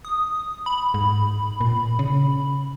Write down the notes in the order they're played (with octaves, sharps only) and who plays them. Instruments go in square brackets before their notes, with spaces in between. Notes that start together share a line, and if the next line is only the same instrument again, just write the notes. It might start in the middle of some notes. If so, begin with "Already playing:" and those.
[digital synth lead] D#6
B5
[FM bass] G#2
A#2
C#3